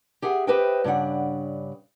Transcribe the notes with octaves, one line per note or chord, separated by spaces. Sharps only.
G4 G#4 E5 F#5
G4 B4 C5 D#5 E5 G5
G2 C#3 D4 F#5